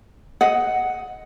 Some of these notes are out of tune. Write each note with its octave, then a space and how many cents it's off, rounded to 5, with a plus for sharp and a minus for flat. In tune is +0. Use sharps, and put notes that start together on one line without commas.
D#5 +10 F#5 +5